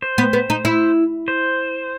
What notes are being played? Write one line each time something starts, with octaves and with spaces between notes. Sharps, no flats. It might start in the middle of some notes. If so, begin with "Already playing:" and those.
C5
B3
B3
D#4
E4
C5